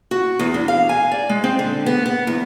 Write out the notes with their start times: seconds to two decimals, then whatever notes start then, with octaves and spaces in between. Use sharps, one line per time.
0.11 F#4
0.39 E2
0.54 D4
0.68 F5
0.89 G#5
1.12 D5
1.29 G#3
1.44 C4
1.59 D3
1.86 B3
2.06 B3
2.27 E2